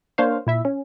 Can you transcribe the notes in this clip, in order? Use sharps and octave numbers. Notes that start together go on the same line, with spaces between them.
A#3 D4 C5 C#5 F5
A#2 E4 E5
C#4